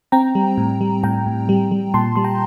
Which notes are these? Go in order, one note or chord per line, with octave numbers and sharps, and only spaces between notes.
C4 G5 A#5
G3
A2
G3
A2 G5 A#5
A2
G3
G3
A#2 A5 C6
G3 C6
G5 A#5